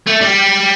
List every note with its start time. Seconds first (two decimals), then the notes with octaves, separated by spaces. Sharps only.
0.07 A3
0.21 G3